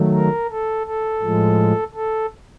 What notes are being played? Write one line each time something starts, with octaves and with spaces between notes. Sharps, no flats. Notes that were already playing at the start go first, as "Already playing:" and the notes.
Already playing: D#3 F#3 A3
A#4
A4
A4
A2 F3 G#3
A4